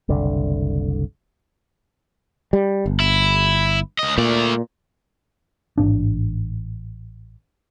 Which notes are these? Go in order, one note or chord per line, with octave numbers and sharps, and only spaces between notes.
F#1 C2 D3 D4
G3
G1
E4
C#2 D#5
A#2 A3 D5
A1 G#2 D4